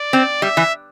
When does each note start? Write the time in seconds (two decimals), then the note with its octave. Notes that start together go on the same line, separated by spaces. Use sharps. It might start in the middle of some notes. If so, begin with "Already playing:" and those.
Already playing: D5
0.13 C4
0.42 G3 E5
0.57 E3